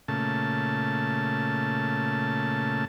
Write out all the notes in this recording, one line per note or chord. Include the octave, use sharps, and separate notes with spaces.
A#2 C#3 A3 A5